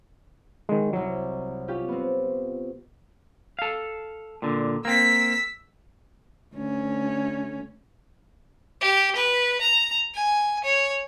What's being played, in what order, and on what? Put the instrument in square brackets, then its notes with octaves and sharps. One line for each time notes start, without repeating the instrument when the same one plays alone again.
[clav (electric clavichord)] D#3 G#3
[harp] C2 E6 [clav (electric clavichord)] F#3
[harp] C#4 F4 G4
B3 C4
[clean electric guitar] A4 F5
A#2 D3
[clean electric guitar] A#3 C4 [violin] E6 B6
[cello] D2 C#4
[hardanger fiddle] G4
B4
A#5
G#5
C#5